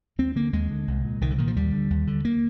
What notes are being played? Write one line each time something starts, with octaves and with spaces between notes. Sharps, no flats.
D#2 C4
D3 A#3
D#2 G#3
D3
C2
A#2
C2 D#3
D3
A#2 D#3
F3
D#2 G3
D3
D#2
D3
A#3